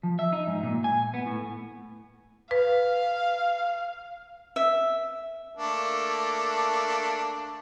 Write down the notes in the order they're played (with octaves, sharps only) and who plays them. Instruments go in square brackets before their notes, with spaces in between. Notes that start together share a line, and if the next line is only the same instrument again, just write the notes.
[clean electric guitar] F3
E5
D#4
G#2
A#2
G#5
B3
A2
[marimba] B4 [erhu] F5
[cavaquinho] E5
[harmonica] A3 A#3 D4